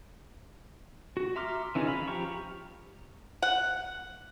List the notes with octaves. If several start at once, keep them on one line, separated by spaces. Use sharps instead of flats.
F#4
E5 A#5 C6 D6 F6
E3 C#4 D#4 F4 G#4
F5 B5
F3 G4 F5 A#5 C#6
F#5